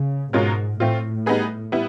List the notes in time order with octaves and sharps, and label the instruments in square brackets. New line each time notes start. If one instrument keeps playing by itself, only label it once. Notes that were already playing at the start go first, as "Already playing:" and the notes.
Already playing: [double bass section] C#3
[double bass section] G#2 [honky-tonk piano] B2 G#3 C#4 F4 A#4
[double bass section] A2 [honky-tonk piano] A3 C4 F4
[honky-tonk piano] G3 B3 D#4 G#4 B4
G3 B3 E4